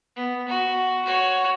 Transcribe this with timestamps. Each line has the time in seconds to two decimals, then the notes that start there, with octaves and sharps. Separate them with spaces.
0.16 B3
0.48 F#4
1.05 F#4 C#5